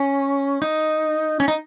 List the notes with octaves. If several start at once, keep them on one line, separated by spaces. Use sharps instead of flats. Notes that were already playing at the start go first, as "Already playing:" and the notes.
Already playing: C#4
D#4
C#4
D#4